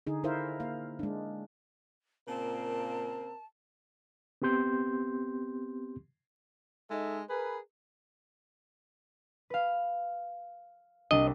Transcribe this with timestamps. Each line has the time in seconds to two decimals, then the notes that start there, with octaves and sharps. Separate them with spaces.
0.07 D3 D#4 G#4
0.24 D#4 E4 A#4 C5 E5 F5
0.60 A#3 F5
0.99 G#3 D4
2.28 A#2 C#3 A#3 C4 A#4 A5
4.42 B3 C4 G4 C6 G6
6.90 G#3 D#4 A4 D#5 E5
7.29 G#4 A#4 B4
9.50 B4 F5
11.11 C2 D4 D#5